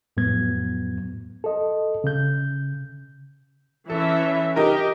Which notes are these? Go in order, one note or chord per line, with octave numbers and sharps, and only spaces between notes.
F2 A2 F#3 B3 G#6
A4 D#5
C#3 G6
E3 C#4 A4 E5
D#4 G4 A#4